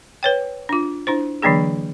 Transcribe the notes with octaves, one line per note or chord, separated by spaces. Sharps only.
B4 C#5 G5
D4 F4
D4 E4 C5
D3 E3 F#3 A#3 D4 G#4